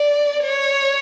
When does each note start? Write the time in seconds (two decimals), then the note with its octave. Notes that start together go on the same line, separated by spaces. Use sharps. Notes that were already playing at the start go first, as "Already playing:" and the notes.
Already playing: D5
0.44 C#5